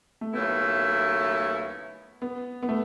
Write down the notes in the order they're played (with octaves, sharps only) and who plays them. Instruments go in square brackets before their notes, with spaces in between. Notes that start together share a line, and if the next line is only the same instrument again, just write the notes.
[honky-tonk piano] A3
[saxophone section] D#2 C#3 F#3 A3 E4 [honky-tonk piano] B3
[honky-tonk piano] B3
B3
A3